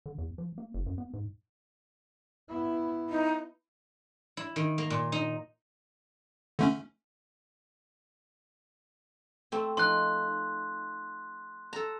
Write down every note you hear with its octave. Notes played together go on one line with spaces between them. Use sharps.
D3
E2
F3
A#3
F#1
F#2
B3
G#2
B3 E4
D#4
E4
D#3
A#3
A#2
D#4
D3 A3 C#4
A3 C4
F3 D#4 C6 F#6
A4 A#5